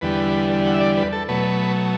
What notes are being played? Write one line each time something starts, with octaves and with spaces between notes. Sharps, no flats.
E2 D3 G3 B4
F#5
E5
D5
B4
A4
B2 F#3 A3 B4